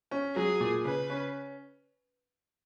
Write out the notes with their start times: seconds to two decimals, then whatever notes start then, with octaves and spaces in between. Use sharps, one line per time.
0.11 C#4
0.36 F#3 G#4
0.60 A#2
0.85 C#3 B4
1.10 C#4